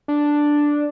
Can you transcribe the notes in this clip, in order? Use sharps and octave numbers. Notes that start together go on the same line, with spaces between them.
D4